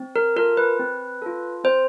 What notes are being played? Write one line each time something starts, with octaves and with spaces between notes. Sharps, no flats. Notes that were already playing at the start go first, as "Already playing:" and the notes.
Already playing: C4
A#4
F4 A4 A#4
B4
C4
F4 A4
C4 C5